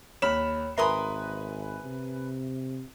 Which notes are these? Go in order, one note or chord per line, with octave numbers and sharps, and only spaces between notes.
D#2 C#5 B5 F6 E7
G#1 A#4 B4 E5 G#5 B5 C6 D#6
C3